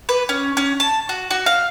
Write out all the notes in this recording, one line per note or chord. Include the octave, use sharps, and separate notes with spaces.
B4
C#4
C#4
A5
F#4
F#4
F5